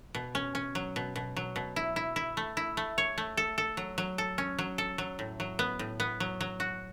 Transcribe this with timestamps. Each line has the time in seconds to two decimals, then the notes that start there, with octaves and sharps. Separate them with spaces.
0.15 B2
0.35 C#4
0.55 C#4
0.75 F#3
0.96 B2
1.16 B2
1.36 F#3
1.56 B2
1.76 E4
1.96 E4
2.16 E4
2.37 A3
2.57 E4
2.77 A3
2.98 C#5
3.18 A3
3.37 A4
3.58 A4
3.77 F#3
3.98 F#3
4.18 A4
4.38 C#4
4.58 F#3
4.78 A4
4.98 F#3
5.19 A2
5.40 F#3
5.59 B3
5.79 A2
6.00 B3
6.20 F#3
6.41 F#3
6.60 F#4